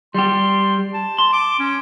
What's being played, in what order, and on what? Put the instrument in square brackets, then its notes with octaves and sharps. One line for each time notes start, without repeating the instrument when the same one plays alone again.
[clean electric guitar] G3 G4 [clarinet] C6
[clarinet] A5
[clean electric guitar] C6
[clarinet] D6
C#4